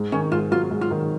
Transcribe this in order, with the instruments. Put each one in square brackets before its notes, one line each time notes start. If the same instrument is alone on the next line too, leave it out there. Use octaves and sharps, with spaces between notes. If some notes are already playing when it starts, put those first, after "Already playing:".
Already playing: [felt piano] G#2
[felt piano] D#3 [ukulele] C#4
[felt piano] G#2 [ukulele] F4
[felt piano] F#3 [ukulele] F4
[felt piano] G#2
[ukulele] F4
[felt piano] D#3